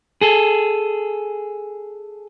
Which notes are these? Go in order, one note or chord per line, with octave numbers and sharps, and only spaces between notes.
G#4 A4